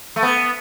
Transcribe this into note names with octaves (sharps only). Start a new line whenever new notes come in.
A3
B3